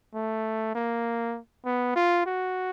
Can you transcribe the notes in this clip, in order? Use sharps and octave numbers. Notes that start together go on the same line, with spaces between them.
A3
A#3
B3
F4
F#4